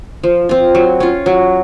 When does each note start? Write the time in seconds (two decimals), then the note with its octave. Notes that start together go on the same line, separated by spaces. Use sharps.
0.23 F3
0.49 C4 F4
0.75 F#3
1.00 C#4 F4
1.26 F#3